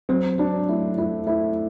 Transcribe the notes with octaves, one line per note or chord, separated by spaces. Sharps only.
F#3 C4
F#3 D4
A3 E4
A3 E4
A3 E4